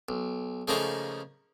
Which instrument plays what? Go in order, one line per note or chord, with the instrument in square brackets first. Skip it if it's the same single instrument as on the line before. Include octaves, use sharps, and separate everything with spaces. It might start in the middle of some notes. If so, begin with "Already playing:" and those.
[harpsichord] B1
C#3 F3 A3 A#3 D#4 G#4